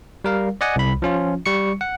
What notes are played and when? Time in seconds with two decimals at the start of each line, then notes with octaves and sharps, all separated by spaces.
0.24 G3 A#4 F5
0.61 D5 D#5 F#5 G#5
0.76 C2 B5
1.02 F3 C#4 F4
1.46 G3 C#6 C#7
1.81 F#5